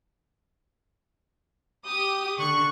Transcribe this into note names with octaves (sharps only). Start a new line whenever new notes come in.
G4 D#6
D3 C#6 F#6